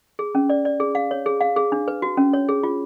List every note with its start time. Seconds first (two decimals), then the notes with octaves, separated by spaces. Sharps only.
0.19 G#4
0.35 C#4
0.49 D5
0.65 D5
0.80 G#4
0.95 F5
1.11 C#5
1.26 G#4
1.41 F5
1.56 G#4
1.72 D4
1.88 B4
2.02 F#4
2.17 C#4
2.33 C#5
2.49 G#4
2.63 F4